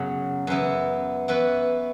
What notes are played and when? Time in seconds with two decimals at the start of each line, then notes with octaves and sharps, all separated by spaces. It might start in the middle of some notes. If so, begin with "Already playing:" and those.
Already playing: F#2 C#3 F#3 B3
0.47 F#2 E3 B3
1.28 E3 B3 F#4 B4